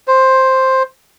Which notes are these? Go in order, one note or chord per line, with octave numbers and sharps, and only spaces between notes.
C5